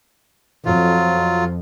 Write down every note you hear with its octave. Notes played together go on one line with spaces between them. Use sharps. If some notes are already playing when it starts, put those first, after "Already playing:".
F2 F#3 F4